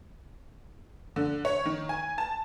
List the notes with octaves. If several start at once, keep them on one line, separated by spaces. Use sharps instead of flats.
D3
C#5
D#3
G#5
A5